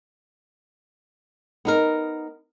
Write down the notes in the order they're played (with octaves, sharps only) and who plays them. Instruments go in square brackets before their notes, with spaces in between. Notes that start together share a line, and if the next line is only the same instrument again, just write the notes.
[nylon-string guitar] B3 D#4 A#4